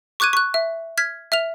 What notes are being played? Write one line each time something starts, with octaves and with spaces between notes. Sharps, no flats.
C#6 D6 F#6 G#6 D#7
C#6 F#6
E5
F6 G#6 B6
E5 F6 F7